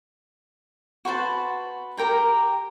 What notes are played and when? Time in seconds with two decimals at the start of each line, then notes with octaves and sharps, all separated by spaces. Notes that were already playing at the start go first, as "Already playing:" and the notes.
1.05 F#4 B4 C5 A5
1.97 G4 A#4 G5 A#5